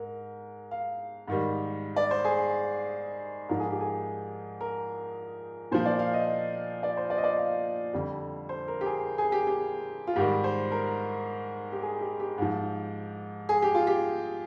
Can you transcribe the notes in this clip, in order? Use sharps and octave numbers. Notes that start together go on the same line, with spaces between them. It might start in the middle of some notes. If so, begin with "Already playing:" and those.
Already playing: G#2 A#4
F5
G#2 D#3 G3
D5
C5
G#4
G#2 F3 A#4
G#4
G4
G#4
A#4
A#2 F3 C5
D5
F5
D#5
D5
C5
D5
D#5
D5
F5
F2 D3 G3
C5
A#4
G4
G#4
G#4
G4
G4
F4
G#2 D#3 G3 G4
C5
A#4
G4
G#4
G4
G4
G#2 F3
G#4
G4
F4
G4